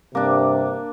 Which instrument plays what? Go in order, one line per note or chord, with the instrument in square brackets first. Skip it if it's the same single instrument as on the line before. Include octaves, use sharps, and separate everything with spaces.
[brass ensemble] G2 C3 [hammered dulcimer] A#3 D4